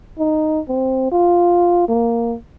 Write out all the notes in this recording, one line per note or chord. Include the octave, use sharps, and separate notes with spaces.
D#4
C4
F4
A#3